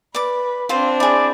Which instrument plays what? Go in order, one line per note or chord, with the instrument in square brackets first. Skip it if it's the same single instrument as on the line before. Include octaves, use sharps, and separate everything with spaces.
[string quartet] B4 [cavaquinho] D5 D6
[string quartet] C4 D4 [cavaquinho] F4 C5
[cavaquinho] E4 G#4 [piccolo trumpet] D5